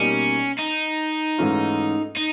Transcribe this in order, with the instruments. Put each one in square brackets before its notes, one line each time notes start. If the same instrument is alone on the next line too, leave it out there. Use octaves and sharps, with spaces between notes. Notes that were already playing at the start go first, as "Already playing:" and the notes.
Already playing: [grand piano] B2 G3 A#3 D#4 [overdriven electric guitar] C#4
[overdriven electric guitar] D#4
[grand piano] G#2 E3 A3 C#4 F4
[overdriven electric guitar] D#4